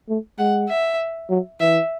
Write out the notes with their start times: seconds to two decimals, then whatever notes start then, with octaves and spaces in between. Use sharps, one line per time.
0.09 A3
0.38 G#3 F#5
0.69 E5
1.30 F#3
1.60 E3 E5